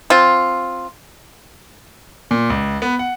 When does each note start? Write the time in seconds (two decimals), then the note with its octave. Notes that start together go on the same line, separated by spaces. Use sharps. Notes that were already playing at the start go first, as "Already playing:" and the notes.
0.10 C4 F4
2.31 A#2
2.50 C#2
2.82 B3
2.99 F#5